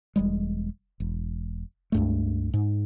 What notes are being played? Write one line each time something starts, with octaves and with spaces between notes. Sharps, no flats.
E1 G3 G#3
E1
C#2 G2 A3
G#2